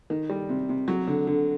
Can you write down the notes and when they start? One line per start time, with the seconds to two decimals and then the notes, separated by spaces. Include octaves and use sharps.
0.10 D#3
0.30 G3
0.49 C3
0.69 C3
0.88 F#3
1.08 D3
1.27 D3